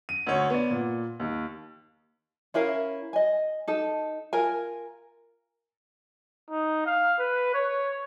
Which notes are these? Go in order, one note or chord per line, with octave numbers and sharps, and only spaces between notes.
D#7
D2 C#5
B3 D5
A#2
D#2
C#4 E4 A#4 F5
D#5 G#5
D#4 A4
F4 A#4 G#5
D#4
F5
B4
C#5